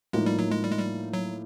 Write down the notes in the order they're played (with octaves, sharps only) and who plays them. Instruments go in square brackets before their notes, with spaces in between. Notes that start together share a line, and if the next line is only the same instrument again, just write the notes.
[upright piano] A2 F3 A#3 D#4 [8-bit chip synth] G#3
[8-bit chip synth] G3
F#3
G#3
G3
G#3
G3
F#3